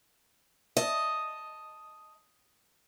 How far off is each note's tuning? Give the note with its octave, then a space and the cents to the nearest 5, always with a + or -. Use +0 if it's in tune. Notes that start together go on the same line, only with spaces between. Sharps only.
D#5 +0 A5 +0